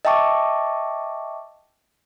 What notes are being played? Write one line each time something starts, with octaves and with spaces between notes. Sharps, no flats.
D#5 E5 G5 A5 C#6 D6